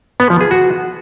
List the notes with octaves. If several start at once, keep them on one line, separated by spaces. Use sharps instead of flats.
B3
F3
G#4
F#4